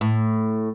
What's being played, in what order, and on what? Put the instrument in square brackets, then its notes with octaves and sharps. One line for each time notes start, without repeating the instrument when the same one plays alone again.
[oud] A2